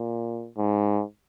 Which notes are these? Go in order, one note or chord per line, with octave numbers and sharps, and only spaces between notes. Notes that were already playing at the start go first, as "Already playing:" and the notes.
Already playing: A#2
G#2